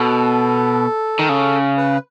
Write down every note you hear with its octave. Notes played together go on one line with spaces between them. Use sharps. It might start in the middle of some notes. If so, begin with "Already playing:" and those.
Already playing: B2 A4
D#3
C#3
B4